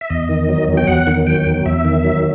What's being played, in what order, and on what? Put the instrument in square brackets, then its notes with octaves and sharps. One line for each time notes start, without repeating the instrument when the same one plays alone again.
[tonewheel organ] E5
E2 D#5
D#3
F#3
E2
G5
E2 F#5
D#3
F#3 G5
E2
E2 E5
D#3
F#3